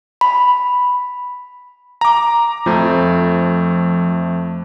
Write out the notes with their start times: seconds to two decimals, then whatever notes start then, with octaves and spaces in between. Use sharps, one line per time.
0.21 B5
2.01 A#5 D6
2.66 F2 F3 A3